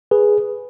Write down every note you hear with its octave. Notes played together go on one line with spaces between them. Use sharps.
G#4 B4